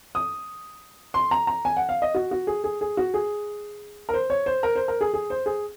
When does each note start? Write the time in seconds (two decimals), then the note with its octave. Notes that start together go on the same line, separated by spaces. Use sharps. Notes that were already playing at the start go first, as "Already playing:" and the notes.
0.15 D#6
1.14 C6
1.31 A#5
1.47 A#5
1.65 G#5
1.77 F#5
1.89 F5
2.02 D#5
2.15 F#4
2.31 F#4
2.47 G#4
2.64 G#4
2.81 G#4
2.97 F#4
3.14 G#4
4.09 A#4
4.14 C5
4.30 C#5
4.46 C5
4.63 A#4
4.76 C5
4.88 A#4
5.01 G#4
5.14 G#4
5.30 C5
5.46 G#4